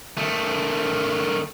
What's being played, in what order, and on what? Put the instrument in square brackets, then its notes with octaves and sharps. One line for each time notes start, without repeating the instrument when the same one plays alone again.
[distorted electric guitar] D#3 A3